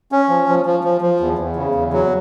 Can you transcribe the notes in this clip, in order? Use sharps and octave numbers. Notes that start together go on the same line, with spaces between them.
C#4
F3
F3
F3
F3
F3
E2
E2
C#3
E2
F#3